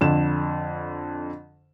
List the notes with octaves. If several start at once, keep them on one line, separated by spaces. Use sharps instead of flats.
F2 D3 E7